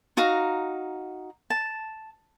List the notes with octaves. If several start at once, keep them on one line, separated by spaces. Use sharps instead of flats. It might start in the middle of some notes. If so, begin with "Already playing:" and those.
D#4 F#4 F5 A#5
A5